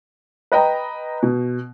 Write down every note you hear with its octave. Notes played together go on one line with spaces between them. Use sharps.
B4 D#5 G5 A#5
B2